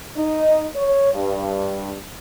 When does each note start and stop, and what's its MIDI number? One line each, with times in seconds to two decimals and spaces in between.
0.16 0.66 63
0.75 1.12 73
1.14 1.96 43